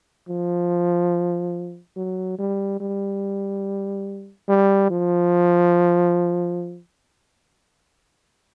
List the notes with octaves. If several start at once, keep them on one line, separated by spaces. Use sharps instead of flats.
F3
F#3
G3
G3
G3
F3